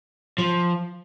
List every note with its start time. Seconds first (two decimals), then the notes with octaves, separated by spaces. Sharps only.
0.38 F3